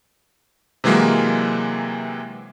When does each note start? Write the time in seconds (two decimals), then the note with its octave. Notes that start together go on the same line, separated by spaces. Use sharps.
0.84 C3 E3 F#3 G#3 A#3